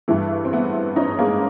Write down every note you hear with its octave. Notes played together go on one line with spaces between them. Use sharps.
G2 E3 A3
C4
A3 B3
C#4 D#4
G#3 A#3